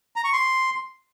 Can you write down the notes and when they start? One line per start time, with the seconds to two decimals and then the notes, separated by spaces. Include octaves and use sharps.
0.16 A#5
0.24 C#6
0.33 C6